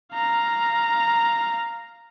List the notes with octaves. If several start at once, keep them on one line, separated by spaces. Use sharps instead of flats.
F5 A#5